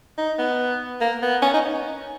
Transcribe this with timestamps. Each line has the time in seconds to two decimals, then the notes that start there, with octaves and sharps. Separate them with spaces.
0.18 D#4
0.39 B3
1.01 A#3
1.22 B3
1.42 C#4
1.54 D#4